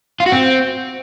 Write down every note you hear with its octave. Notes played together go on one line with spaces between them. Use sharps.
F4
F#4
C4